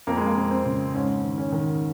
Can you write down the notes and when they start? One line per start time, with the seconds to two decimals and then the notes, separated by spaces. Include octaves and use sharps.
0.07 F2 A#3
0.17 G#3
0.27 A#3
0.36 F2
0.50 C4
0.65 C#3
0.94 G#2 C#4
1.23 D#3
1.38 C#4
1.52 D#3